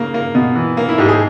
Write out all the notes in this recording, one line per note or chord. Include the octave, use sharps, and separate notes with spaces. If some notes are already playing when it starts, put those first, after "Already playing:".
Already playing: C#3 A#3
A#3
B2
E3
A#3
E4
G#2 G4
G#4